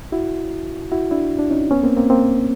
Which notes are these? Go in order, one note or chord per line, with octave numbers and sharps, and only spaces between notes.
E4 F#4
E4 F#4
D4 E4
D4
C#4 D#4
B3 C#4
A#3 C4
A#3 C4
A#3 C4